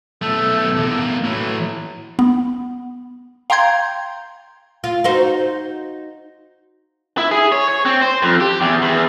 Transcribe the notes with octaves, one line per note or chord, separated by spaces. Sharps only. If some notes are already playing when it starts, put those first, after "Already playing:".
B1 A3 A4
E2 A#3
A2 E3 F#3
B3
F5 G5 A#5 C6 G6 G#6
F4
D#4 F#4 C5
E4
G#4
C#5
C#5
C4
C5
F2
G4
E2
E2